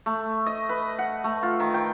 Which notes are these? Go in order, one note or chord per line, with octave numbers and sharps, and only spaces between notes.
A3
D#5
B4
F#5
A3
F4
D#3
G5